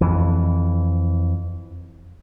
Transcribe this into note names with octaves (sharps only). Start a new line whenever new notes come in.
F2 E3